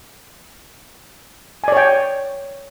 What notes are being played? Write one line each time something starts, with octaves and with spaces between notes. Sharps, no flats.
C#5 D5 G5 G#5